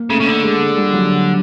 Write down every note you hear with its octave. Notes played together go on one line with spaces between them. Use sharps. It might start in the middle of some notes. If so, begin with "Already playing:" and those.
Already playing: A#3
C#3 A3
C#3
D3
G#3
G#3
G3
F#3